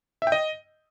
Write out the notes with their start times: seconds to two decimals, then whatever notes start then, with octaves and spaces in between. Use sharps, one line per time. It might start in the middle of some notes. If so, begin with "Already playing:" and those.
0.22 E5
0.27 G5
0.32 D#5